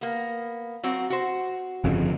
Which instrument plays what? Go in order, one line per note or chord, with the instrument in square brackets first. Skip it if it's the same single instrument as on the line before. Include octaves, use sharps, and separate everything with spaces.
[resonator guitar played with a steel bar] A#3 B3
F#3 C4 F#4
F#4 C5
[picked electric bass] G1 F2 C#3